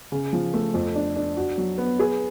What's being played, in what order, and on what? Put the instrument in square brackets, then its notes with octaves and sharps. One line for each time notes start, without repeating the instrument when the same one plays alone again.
[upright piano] C#3
F3
A3
F2
D4
D4
F#4
F#3
B3
G#4